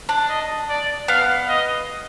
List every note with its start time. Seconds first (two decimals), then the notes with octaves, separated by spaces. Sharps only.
0.09 D4
0.29 D#5
0.70 D5
1.08 B3 F5
1.49 D#5